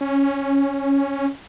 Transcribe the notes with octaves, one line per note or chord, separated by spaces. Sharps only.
C#4